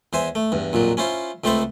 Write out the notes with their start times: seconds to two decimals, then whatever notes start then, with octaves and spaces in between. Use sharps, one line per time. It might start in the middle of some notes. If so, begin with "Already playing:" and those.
0.13 E2 C5 E5 G#5
0.35 A3
0.52 E2 G2
0.73 A#1 F2 A#2 F#3
0.97 C#4 E4 F4 C5
1.44 C#2 A3 C4 A4 C5 B5